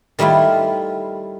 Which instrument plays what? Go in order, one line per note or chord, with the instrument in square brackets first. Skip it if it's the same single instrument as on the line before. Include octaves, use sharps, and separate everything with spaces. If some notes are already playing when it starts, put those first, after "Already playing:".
[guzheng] D#3 G3 A3 E4 F4